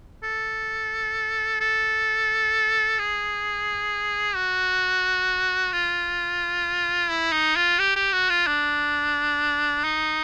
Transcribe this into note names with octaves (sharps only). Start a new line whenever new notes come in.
A4
A4
G#4
F#4
F4
E4
D#4
F4
G4
G4
F#4
F4
D4
D#4